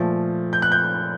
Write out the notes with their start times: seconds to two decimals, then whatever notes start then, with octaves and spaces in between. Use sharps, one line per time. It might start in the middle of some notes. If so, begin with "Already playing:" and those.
Already playing: A#2 F3 A3
0.53 G6
0.62 F#6
0.72 G6